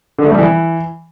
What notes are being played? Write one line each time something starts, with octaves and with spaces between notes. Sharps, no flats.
D3
A3
G3
E3